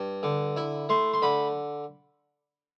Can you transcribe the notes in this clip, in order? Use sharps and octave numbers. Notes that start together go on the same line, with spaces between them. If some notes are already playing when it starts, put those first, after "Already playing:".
Already playing: G2
D3
E4
A3 C6
C6
D3 B5